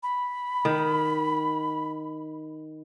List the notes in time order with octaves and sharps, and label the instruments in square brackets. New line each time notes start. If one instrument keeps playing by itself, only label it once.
[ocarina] B5
[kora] D#3